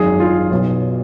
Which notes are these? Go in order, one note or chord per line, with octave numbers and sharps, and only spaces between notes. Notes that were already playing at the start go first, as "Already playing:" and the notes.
Already playing: G#1 F#2 D#3 G#4
F4
B1 B2